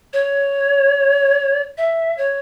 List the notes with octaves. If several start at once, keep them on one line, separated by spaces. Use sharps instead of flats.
C#5
E5
C#5